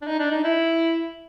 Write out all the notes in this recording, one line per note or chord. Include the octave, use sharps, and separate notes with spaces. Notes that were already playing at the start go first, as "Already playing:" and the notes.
D4
D#4
D4
D#4
E4